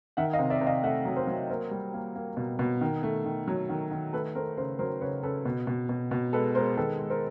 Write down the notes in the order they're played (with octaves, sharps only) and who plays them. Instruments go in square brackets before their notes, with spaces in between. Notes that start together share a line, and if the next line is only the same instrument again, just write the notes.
[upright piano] D#3 E5 F#5
D#5 F5
C3
D5 E5
C3
D#5 F5
A3 E5 F#5
F#3
A#4 C5
F#3
A#3 A#4 C5
G3
A#3
A#3
B2
B2
D#3
A3
D#3
F#3
D#3
D#3
A3 A4 B4
A3 A#4 C5
C#3 A#4 C5
F#3 A#4 C5
C#3 B4 C#5
C#3 A4 B4
B2
B2
B2
B2
G#3 A4 B4
G#3 A#4 C5
D#3 A4 B4
G#3
A#4 C5